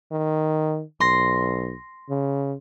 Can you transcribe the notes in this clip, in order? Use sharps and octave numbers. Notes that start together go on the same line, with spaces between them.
D#3
B1 C6 A#6
C#3